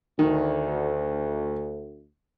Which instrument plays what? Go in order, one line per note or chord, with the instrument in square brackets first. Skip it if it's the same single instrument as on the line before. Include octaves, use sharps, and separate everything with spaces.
[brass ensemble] D2 [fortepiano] D#3